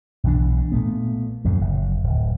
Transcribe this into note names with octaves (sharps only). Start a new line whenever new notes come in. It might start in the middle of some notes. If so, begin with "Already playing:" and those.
B1 B2 E3 D4
A#2 A3 B3
F#2 A#2 D3 F3
F#1
D1